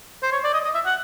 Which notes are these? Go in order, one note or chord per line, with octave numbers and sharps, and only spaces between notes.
C5
C#5
D5
D#5
D#5
E5
F#5